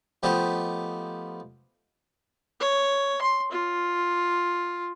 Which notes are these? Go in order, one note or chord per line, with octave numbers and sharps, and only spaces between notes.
F3 A3 B3 G4 D#5
C#5
C6
F4